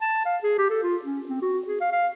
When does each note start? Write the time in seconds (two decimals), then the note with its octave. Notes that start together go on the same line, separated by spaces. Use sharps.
0.01 A5
0.26 F5
0.43 G#4
0.58 G4
0.70 A4
0.83 F4
1.05 C#4
1.29 C4
1.42 F#4
1.67 G#4
1.81 F5
1.92 F5